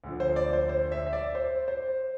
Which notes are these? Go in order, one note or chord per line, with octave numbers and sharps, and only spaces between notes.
D2 D3 F3
C5
D5
C5
C5
E5
E5
D5
C5
C5